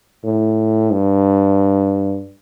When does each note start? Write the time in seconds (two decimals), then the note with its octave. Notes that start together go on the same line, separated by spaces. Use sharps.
0.24 A2
0.91 G2